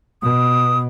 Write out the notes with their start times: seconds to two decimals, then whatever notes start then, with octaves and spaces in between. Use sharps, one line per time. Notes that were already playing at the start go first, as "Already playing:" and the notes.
0.22 B2 D#6